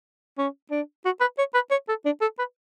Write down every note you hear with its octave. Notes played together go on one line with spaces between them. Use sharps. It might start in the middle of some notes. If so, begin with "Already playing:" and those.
C#4
D4
F#4
B4
C#5
B4
C#5
A4
D4
A4
B4